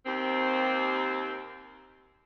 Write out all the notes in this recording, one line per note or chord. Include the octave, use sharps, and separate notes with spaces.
D#2 C4